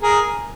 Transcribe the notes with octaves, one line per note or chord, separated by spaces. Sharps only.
G#4 A#4